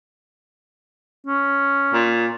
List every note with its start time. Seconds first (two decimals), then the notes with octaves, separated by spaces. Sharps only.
1.27 C#4
1.94 A#2